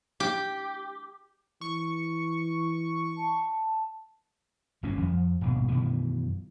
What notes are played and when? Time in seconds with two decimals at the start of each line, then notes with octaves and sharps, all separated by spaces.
0.20 G4
1.61 E3 C#6
3.17 A5
4.83 G1 F#2 A#2 C#4
4.99 F2 F3
5.41 D#1 G#1 D#2 B2
5.68 F#2 B2 D#3 E3